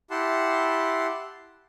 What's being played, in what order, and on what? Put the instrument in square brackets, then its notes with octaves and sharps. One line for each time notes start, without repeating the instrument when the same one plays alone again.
[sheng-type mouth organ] E4 G4 F#5 A5 C6